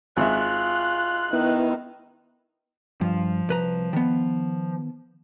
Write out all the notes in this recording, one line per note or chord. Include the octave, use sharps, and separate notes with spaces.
G#1 F4 E5 F#6
D#3 B3 E4
G2 F3
C2 B4 A#5
D#3 B3